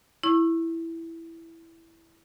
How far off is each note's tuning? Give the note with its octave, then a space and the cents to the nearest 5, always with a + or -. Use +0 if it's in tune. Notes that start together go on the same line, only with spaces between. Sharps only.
E4 +5 C#6 -25